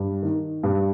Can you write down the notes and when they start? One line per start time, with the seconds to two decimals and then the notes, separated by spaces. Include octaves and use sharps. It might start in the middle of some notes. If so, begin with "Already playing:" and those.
Already playing: G2
0.22 D#3
0.63 G2